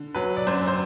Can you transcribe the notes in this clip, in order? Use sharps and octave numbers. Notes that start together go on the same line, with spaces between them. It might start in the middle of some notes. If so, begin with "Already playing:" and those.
Already playing: D3
F#3 B4
D5
F#2 C5
C5